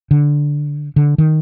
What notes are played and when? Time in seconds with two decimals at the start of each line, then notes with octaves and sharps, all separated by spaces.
0.11 D3
0.96 D3
1.18 D#3